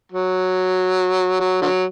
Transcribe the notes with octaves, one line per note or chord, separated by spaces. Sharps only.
F#3
F#3
D3 F#3